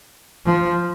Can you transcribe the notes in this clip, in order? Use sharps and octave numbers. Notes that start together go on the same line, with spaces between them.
F3